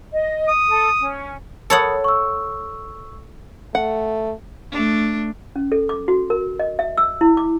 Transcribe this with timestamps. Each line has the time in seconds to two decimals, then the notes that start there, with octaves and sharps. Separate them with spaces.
0.13 D#5
0.48 D#6
0.69 A4
1.00 C#4
1.70 A4 A#4 C#5 F#5 B5 D#6
2.04 C#6 E6
3.75 A3 F#5
4.72 A3 D4
5.56 C#4
5.72 A4
5.89 D6
6.08 F#4
6.30 A#4
6.59 D#5
6.79 E5
6.98 E6
7.21 E4
7.37 D6